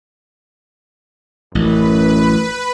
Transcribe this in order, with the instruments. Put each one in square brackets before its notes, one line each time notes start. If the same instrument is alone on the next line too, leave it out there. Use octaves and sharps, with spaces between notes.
[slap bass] A1 [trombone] F#2 [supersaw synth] B4